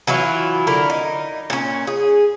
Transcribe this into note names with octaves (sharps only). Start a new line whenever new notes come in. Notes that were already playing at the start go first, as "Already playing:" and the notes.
E3 F#3 E4 F4
D3 E4 A#4
D#4
A#2 C#4
G#4